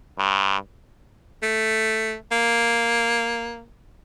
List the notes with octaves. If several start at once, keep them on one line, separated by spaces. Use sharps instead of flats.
G2
A3
A#3